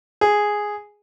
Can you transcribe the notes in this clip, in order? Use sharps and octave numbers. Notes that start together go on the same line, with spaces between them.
G#4